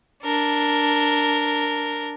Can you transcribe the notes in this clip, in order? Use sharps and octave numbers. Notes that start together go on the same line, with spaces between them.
D4 A#4